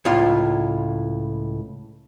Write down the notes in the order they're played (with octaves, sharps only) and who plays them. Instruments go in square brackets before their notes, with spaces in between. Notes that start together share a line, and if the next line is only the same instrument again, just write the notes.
[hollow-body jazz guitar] C#2 A2 F4 F5